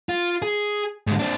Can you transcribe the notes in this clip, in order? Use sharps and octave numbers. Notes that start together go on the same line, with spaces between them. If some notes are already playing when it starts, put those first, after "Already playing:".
F4
G#4
G#2 D3
C4 D4